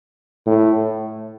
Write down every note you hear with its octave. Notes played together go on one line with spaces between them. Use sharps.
A2